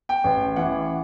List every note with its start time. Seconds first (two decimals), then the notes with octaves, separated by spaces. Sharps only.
0.09 G5
0.24 A1
0.56 E3 F#5